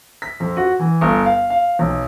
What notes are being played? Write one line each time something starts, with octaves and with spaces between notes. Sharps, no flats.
B6
F2
F#4
E3
G1
F5
F5
B1